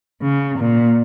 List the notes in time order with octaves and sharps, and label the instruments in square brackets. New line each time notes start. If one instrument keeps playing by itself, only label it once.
[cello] C#3
A#2